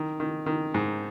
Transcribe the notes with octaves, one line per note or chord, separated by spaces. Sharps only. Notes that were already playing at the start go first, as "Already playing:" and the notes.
Already playing: D#3
D#3
D#3
G#2